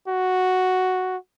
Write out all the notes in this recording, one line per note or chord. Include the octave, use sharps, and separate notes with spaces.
F#4